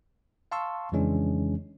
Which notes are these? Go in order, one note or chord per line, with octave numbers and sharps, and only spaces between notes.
F5 A5 C6 C#6 E6
F2 C#3 E3 G#3 C#4 D4